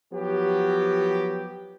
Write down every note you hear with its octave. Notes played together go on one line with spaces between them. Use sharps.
F3 F#3 B3 G4